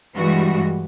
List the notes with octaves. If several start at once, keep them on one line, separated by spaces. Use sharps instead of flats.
G2 E3 G3 G#3 F#4